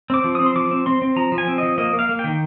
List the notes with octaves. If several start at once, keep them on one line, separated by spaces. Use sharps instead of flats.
C4 D6
F3
C4 D#6
C6
F3 D6
C4
C4 C6
C4
F3 A#5
F3
G#5
C4
F3 D#5
A#3 D#5
A#3
F5
A#3
D#3 G5